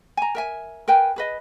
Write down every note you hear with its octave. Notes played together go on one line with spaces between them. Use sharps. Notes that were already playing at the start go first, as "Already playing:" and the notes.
G#5 A#5
A#4 E5 G#5
A#4 B4 G5 G#5
G#4 B4 D#5